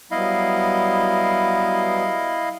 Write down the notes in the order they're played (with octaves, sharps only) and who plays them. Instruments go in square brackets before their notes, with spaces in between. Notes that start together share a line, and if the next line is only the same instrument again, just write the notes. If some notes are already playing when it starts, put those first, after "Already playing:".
[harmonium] F#3 G3 B3 [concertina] E4 D#5 F5